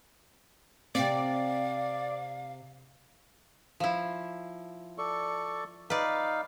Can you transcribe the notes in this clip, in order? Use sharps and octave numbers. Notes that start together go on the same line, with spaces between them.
C3 C4 D5 F5
F3 E4
A4 D5 C#6
D#4 B4 D5 F5